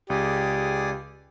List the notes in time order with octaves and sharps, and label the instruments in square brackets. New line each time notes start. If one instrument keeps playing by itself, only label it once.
[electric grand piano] C#2 [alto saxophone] G4 [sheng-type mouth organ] G#4 D5 D#6